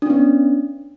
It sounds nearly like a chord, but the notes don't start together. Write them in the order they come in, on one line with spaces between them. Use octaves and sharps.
D4 C#4 B3